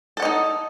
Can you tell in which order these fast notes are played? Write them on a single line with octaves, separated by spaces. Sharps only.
A4 F#5 D#5 D#4